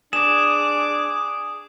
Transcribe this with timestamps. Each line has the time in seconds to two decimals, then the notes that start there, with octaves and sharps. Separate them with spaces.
0.13 D4 G#4 D6 E7